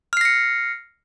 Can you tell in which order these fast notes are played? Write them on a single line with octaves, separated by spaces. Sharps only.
F6 C7 A#6 C#7